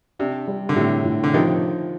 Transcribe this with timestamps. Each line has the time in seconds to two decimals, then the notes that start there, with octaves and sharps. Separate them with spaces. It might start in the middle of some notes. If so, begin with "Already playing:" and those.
0.19 C3 D4
0.47 G3
0.69 D3
0.76 A2 C3
1.05 A2
1.24 D3
1.33 C3 D#3 F3